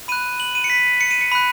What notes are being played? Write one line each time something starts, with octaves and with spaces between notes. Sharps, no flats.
B5 F#6 D#7
F#7
D#7
C#7
B6
C#7
D#7
C#7
B5 F#6